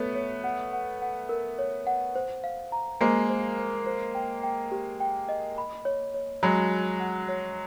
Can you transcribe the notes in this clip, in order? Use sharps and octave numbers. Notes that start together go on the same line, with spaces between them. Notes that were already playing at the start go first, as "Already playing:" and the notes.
Already playing: A3 B3 C#5
C#5
F#5
F#5
F#5
A#4
C#5
F#5
C5
F5
A#5
G#3 A#3 C5
C5
C5
C5
G5
G5
G4
G5
D#5
B5
C#5
C#5
F#3 G#3 B5
B5
F#5
C#5